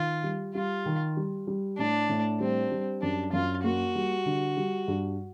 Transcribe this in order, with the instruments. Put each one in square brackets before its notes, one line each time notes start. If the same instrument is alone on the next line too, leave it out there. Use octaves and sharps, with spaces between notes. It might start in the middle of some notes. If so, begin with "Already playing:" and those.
Already playing: [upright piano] D#3 [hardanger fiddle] F4
[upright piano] G3
[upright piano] G3 [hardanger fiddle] F4
[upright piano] D#3
G3
G3
[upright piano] A2 [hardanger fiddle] D4
[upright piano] A2
[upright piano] G3 [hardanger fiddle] C4
[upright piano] G3
[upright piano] F#2 [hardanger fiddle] D4
[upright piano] F#2 [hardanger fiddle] F4
[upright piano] A#3 [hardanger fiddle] F#4
[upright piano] G3
D3
G3
G2